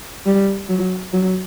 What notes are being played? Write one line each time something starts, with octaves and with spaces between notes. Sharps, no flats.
G3
F#3
F#3